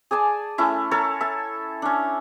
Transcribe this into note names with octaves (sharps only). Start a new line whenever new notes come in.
G#4 D5 G#5 A5
A3 C#4 E4
A4 A#4 C#5 A5
E5 A5
C#4 D4